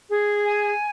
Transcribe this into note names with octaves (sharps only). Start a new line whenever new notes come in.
G#4
G#5